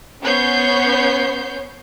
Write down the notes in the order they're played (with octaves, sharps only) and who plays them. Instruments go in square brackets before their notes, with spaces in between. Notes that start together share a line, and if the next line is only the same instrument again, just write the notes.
[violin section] B3 C#4 C5 C#5 G6 C7